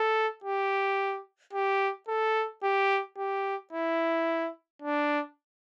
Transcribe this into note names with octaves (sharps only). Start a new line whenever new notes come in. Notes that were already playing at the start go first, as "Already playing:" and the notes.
Already playing: A4
G4
G4
A4
G4
G4
E4
D4